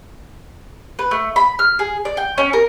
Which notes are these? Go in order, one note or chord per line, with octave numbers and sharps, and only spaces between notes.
B4
A3
B5
F6
G#4
D5
G5
C#4
A#4